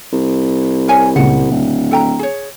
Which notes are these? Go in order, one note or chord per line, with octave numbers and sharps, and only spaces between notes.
C2
A#4 C#5 G#5
C#2 A#2 C#3 F#5
D1
A4 G5 A#5
G#4 C#5